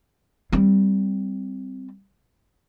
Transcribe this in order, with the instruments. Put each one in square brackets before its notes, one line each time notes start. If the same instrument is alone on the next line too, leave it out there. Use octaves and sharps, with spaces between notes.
[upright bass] G3 C4